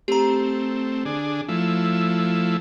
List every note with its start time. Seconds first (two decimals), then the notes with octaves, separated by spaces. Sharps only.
0.08 A3 C4 G4 A#5
1.05 D3 D4 G#4
1.48 F3 A3 E4